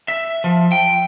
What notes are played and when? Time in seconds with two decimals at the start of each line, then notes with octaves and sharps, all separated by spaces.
0.08 E5
0.44 F3
0.72 G5